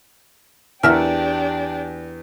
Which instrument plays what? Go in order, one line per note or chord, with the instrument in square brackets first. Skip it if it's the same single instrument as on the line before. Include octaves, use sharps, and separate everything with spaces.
[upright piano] E2 [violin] D4 G4 [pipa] A#4 E5 F#5